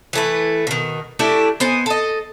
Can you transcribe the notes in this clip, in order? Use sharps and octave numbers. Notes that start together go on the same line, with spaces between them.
E3 A3 B4
B2 D#3
A3 D4 E4 G4
B3 D#4 C5 G#5
A4 D#5